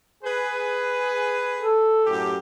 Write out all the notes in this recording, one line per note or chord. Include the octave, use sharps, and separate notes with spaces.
G#4 B4
A4
F#2 A2 G4